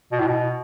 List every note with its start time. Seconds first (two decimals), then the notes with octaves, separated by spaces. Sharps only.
0.12 B2
0.20 A2
0.27 B2